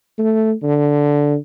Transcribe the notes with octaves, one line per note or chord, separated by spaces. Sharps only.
A3
D3